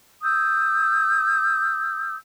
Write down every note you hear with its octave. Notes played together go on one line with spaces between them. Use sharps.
D#6 E6 G6